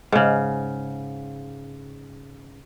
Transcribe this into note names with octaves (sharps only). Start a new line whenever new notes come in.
G#2 C#3